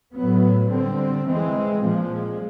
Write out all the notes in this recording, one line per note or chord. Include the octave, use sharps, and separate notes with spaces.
A2 F#3 B3
D3 G3 C4
E3 G#3 C4
A#2 F3 G#3